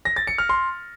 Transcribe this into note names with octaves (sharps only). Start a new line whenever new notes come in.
A#6
A6
C#7
F6
C6